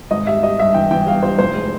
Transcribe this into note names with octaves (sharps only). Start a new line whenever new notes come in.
G#1 D#5
G3 E5
G3 D#5
G2 E5
E3 G5
E3 G5
G2 F5
G3 C5
F1 C5
G#3